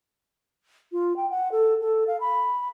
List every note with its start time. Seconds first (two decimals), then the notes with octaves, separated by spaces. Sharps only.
0.92 F4
1.16 G5
1.31 F#5
1.52 A4
1.81 A4
2.07 F5
2.20 B5